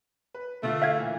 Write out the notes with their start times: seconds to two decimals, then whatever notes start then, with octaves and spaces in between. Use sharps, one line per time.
0.34 B4
0.63 D3 A3 F4
0.82 E5 F5 G#6
0.97 A#2 E3